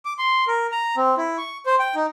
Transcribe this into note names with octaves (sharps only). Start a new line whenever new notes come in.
D6
C6
A#4
A#5
C4
E4
C#6
C5
G5
D#4